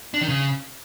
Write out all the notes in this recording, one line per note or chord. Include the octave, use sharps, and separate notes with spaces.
D4
D#3
C#3